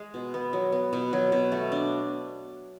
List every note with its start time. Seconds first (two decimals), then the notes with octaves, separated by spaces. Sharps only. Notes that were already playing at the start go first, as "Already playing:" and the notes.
Already playing: G#3
0.14 B2
0.34 B3
0.53 F#3
0.72 B3
0.93 B2
1.13 F#3
1.32 B2
1.52 A3
1.72 D4